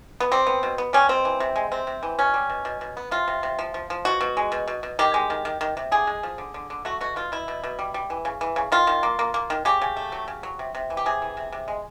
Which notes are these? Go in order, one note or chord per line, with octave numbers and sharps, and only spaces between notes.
B3
G3 C4
B3
B2
B3
G3 C#4
B2 C4
E3
C3
G#3
C3 C4
C3
E3
B2 C#4
G3
B2
B2
B2
B3
C3 F4
C3
C3
F3
F3
F3
B2 F#4
B2
G#3
B2
B2
B2
D#3 G4
G#3
D#3
D#3
D#3
C3
D3 G#4
G#3
F3
D3
D3
D3
A3 F#4
B2 F#4
B2 F4
B2 E4
B2
B2
G3
G3
E3
C#3
E3
C#3
D#3 F4
D#3
A#3
A#3
A#3
D#3
C#3 G4
C#3
A3
F#3
C#3
F#3
C3
C3
E3
G4
C3 G#4
E3
C3
C3
G#3